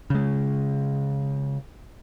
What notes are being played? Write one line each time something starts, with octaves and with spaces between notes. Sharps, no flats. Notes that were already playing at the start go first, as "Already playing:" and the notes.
C#3 G#3